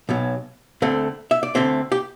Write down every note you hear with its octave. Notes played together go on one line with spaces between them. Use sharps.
B1 B2 F#3
D2 D3 A3 C4
E5
D5
D2 D3 A3 C4 C5
G4